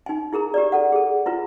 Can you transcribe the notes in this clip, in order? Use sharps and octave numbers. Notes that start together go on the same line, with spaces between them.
D#4 G#5
E4 G#4 A#4 A#5
G4 B4 D5
A4 F#5
G#4 A4
E4 F4 B4